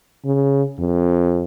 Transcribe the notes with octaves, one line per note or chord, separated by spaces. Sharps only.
C#3
F2